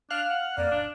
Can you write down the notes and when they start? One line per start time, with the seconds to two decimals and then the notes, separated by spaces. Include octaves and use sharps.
0.10 D4 F5 F6 F#6
0.29 F#5
0.58 F2 A#3 D5
0.71 D1 D4